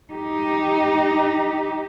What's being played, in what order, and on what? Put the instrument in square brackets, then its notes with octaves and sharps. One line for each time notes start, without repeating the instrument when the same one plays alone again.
[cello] D#4 G4